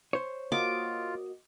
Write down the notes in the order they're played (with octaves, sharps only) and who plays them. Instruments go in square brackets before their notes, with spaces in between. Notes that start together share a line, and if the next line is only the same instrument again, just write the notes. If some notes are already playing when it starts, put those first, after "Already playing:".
[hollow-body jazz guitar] C5 C#5
[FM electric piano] A#3 F#4 D#5 [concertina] F4 [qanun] D6